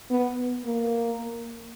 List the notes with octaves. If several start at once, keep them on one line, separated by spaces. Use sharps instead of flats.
B3
A#3